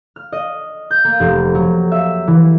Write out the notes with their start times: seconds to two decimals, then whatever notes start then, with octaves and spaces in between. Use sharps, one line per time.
0.16 F6
0.32 D#5
0.91 G6
1.04 A#3
1.20 F1
1.55 F#3
1.92 E5
2.27 E3